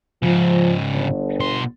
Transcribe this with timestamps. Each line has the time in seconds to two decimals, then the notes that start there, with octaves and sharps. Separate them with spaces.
0.23 G#2 C#3 F3
0.93 G1
1.40 B2 C6